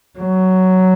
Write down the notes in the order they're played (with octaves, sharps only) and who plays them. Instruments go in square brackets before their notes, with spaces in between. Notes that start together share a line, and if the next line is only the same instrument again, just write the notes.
[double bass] F#3